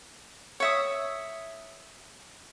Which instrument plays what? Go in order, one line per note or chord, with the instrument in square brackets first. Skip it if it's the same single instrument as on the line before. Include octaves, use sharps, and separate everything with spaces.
[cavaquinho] C#5 E5 D#6